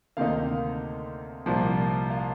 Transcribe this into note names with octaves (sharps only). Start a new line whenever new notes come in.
D2 C3 D#3 A#3 D#4 F5
C2 A#2 F3
F5